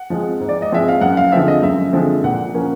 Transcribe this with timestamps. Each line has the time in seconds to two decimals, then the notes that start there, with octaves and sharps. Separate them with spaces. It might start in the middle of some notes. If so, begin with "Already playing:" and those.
Already playing: F#5
0.10 F3 G#3 C4
0.40 G#2
0.49 D5
0.62 D#5
0.72 F3 G#3 C4 E5
0.88 F5
1.01 F#2 F#5
1.17 F5
1.32 D3 F3 G#3 C4 E5
1.48 D#5
1.62 F#2 E5
1.93 D3 F3 G#3 C4
2.24 A#2 F#5
2.54 F3 A#3 C#4